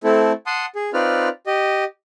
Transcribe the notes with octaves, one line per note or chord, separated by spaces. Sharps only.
A3 C4 E4 A4
F#5 A5 C6 D#6
G#4
C4 D#4 F4 B4 D5 F6
G4 D#5